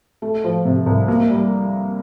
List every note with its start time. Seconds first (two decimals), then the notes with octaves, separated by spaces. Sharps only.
0.22 A3
0.44 F3
0.65 C3
0.86 C2
1.08 A#3
1.29 G3